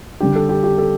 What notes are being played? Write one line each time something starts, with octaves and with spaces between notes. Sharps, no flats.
D3 G3 D4 G4
A4
G4
G4
A4